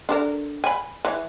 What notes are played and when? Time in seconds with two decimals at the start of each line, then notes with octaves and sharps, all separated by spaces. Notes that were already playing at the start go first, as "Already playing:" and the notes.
0.09 D4 A4 A#4
0.64 G#5 B5
1.05 E3